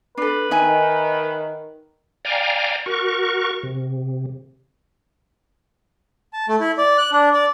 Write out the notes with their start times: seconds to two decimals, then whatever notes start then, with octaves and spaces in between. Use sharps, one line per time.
0.17 D4 A4 B4
0.51 D#3 D#4 E5 G#5
2.25 D5 F5 G5 G#5 A#5
2.86 F#4 A#4 C#6
3.63 C3
6.33 A5
6.48 A3
6.60 E4
6.78 D5
6.98 F#6
7.12 D4
7.34 D5